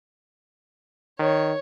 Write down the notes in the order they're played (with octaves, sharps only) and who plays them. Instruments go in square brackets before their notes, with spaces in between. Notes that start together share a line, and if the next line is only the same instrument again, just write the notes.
[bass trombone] D#3 [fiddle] C#5